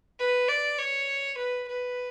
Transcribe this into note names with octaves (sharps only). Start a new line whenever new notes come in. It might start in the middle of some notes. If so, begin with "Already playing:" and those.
B4
D5
C#5
B4
B4